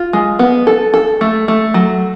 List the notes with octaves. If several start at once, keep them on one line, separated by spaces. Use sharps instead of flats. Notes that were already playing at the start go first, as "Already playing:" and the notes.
Already playing: F4
G#3
B3
A4
A4
A3
A3
F#3